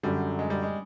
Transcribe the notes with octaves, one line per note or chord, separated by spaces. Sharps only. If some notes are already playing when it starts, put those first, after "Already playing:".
F#2 D3 F#3 G3
G#3
G3
G#3